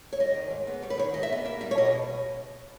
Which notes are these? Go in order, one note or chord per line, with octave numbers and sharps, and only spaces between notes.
C#5
G3 D#5
D#3
G#2
B3
G3 C#5
B4
D#3 C#5
G#2 D#5
E5
B3 D#5
A#3 E5
G3 E5
C#5
B2 D#5
B2